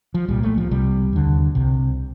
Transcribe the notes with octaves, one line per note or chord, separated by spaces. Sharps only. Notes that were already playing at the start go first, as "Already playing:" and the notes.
F3
C2 A#2 G3
A3
F3
C2 C3 G3
D#2 D3
C2 C3